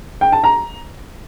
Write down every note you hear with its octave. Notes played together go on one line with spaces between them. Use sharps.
G5
A5
A#5